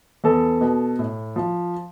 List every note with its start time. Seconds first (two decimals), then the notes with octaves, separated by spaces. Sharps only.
0.24 E2 A4
0.61 B2
0.99 A2
1.36 F3